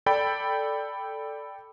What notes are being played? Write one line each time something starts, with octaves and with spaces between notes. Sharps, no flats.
A4 D5 G5 B5